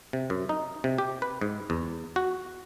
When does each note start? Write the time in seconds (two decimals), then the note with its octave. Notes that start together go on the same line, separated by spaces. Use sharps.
0.13 C3
0.30 F#2
0.49 D#4
0.84 C3
0.98 G4
1.22 B4
1.41 G#2
1.70 E2
2.16 F#4